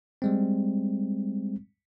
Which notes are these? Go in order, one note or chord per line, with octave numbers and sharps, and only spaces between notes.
G3 G#3 C4